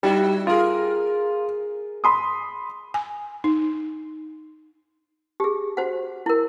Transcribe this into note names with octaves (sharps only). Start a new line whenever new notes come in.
G3 D#4 E4 F#4
F4 G#4 A#4
B5 C6 D#6
G#5
D#4
G4 G#4
F#4 C5 F#5
E4 A#4